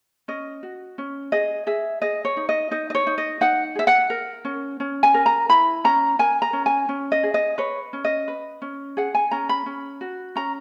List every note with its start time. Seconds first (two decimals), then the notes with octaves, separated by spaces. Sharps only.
0.28 C#4 D#5
0.63 F#4
0.98 C#4
1.32 G#4 D#5
1.67 G#4 E5
2.02 G#4 D#5
2.25 C#5
2.37 D#4
2.49 D#5
2.71 D#4 D#5
2.90 D#5
2.95 C#5
3.07 D#4
3.18 D#5
3.41 D#4 F#5
3.75 G#4 E5
3.87 F#5
4.10 A#4
4.45 C#4
4.80 C#4
5.03 G#5
5.14 A#4
5.26 A#5
5.49 E4 B5
5.84 C#4 A#5
6.19 A#4 G#5
6.42 A#5
6.53 C#4
6.66 G#5
6.89 C#4
7.12 D#5
7.23 G#4
7.34 D#5
7.58 B4 C#5
7.93 C#4
8.05 D#5
8.28 B4
8.62 C#4
8.97 G#4 F#5
9.15 G#5
9.31 C#4 A#5
9.49 B5
9.66 C#4
10.01 F#4
10.36 C#4 A#5